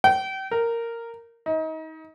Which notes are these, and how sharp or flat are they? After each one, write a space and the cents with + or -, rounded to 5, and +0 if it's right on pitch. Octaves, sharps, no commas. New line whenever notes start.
G5 -35
A#4 -10
D#4 +30